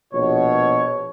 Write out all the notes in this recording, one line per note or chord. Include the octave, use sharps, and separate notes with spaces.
A#1 B2 F#4 C#5